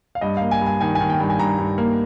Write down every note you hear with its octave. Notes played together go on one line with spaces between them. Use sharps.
F5
G2 D#5
A#3 F5
G#5
G2
G#5
D#3 G#5
G#5
D#3
G5
G2
G#5
G2 A#5
G2
A#3